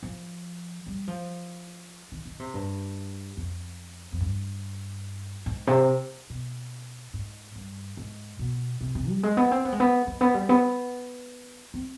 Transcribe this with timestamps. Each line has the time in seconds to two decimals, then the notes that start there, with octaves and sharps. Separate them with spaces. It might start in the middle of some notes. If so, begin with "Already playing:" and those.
0.03 F3
0.86 G3
1.08 F3
2.12 D#3
2.25 D#3
2.40 C3
2.54 G2
3.37 F2
4.13 F2
4.21 G2
5.46 G#2
5.67 C3
6.30 B2
7.14 G#2
7.55 G2
7.97 G#2
8.39 B2
8.81 C3
8.95 C3
9.09 G3
9.23 G#3
9.37 B3
9.51 C4
9.65 B3
9.72 G#3
9.80 B3
10.07 G#3
10.21 B3
10.34 G3
10.49 B3
11.74 C4